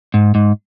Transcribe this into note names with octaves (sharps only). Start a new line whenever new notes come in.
G#2
G#2